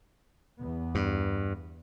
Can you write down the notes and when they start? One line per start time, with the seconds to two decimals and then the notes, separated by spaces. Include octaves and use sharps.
0.60 E2 B3
0.95 G2